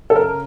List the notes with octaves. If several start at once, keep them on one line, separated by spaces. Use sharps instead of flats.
A4
C#3 A#4